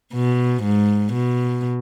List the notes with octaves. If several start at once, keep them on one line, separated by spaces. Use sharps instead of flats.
B2
G#2
B2